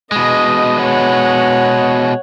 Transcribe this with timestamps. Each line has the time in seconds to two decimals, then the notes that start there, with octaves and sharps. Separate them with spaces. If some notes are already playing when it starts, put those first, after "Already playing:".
0.12 B2 G#3 D#5
0.81 C#5 F#5